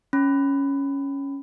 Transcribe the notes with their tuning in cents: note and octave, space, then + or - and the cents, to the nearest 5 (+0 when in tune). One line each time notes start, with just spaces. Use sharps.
C#4 +0 B5 +15